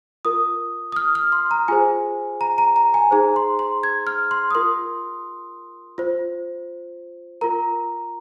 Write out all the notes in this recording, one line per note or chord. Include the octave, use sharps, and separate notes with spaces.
F4 A#4 D#6
D#6
F6
F6
C6
A#5
F4 G#4 C5 G#5
A#5
A#5
A#5
G#5
D#4 G#4 C5 A#5
C6
C6
G#6
F6
C6
D#6
F4 A#4 C6
F4 C5
F4 A#4 A#5